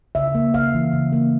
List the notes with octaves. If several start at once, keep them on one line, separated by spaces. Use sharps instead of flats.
C#3 E5
A#3
C#3 F5
E3
C#3
A#3